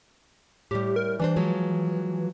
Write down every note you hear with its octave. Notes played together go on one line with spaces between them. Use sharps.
A2 G3 G4
A#4
E3 G3 D4 C5
F3 F#3 G#3